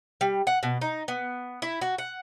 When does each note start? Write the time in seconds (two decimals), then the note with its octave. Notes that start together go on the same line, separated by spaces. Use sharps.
0.21 G3
0.47 F#5
0.63 B2
0.81 D#4
1.08 B3
1.62 E4
1.81 F#4
1.98 F#5